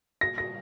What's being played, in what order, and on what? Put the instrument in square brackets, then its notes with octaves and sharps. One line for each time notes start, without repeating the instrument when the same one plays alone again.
[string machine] A#2 G3 A#3 [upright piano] A#6
[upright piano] A#6